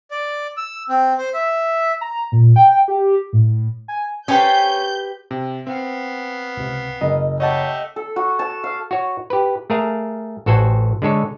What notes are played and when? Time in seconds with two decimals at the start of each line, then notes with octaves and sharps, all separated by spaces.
0.11 D5
0.57 E6
0.89 C4
1.18 C5
1.34 E5
2.01 A#5
2.32 A#2
2.56 G5
2.88 G4
3.33 A2
3.88 G#5
4.28 C#4 G4 A4 B4 C5 G5 C6 G6
5.31 C3
5.67 B3 C4 F5
6.57 C#2 C3
7.01 F#1 D#5
7.40 A3 G4 C#5 D#5 F#5 A5
7.96 A4
8.16 F#4
8.39 A5
8.64 F5
8.91 F#4 C#5
9.30 G4 B4
9.70 A3 G#4 A#4 F5
10.46 A1 F#4 A4 C5 F#5 G#5
11.02 D3 G#3 A4 C#5